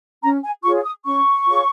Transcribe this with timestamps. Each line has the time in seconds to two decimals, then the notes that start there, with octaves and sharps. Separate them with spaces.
0.23 C#4 A#5
0.44 G#5
0.64 F4 G#4 C#5 C#6
0.85 D#6
1.05 C#4 C#6
1.47 F4 G#4 C#5